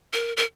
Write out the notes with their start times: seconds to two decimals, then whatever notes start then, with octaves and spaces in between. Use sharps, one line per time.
0.13 A#4
0.37 A#4